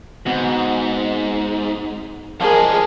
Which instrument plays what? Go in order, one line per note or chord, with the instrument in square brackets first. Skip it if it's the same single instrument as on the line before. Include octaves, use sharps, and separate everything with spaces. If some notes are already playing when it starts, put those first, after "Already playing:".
[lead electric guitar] G#2 [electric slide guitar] B3 C4 F#4
[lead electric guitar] F3 G#3 [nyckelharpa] G#4 [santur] A#4 G#5 A5